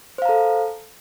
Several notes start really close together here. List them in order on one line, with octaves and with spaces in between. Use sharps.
C5 F5 A#5 A4